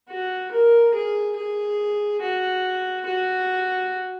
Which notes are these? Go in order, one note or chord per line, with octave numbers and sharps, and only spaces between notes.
F#4
A#4
G#4
G#4
F#4
F#4